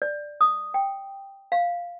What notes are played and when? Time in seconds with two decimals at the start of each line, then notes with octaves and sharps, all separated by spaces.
0.02 D5
0.41 D#6
0.74 G5
1.52 F5